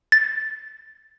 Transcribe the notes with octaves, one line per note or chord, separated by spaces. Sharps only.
A6